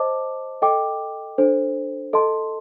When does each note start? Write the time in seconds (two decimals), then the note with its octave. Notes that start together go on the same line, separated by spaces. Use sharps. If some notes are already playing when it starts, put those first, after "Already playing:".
Already playing: C5 D#5 A5 D6
0.62 A4 D#5 G5 D6
1.38 D4 A4 C5
2.13 A4 D#5 A5 C6